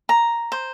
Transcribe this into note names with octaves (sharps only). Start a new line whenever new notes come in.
A#5
C5